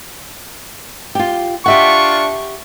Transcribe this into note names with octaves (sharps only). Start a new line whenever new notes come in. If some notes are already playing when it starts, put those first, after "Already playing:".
F4 G4
D4 F4 G4 E5 F#5 C#6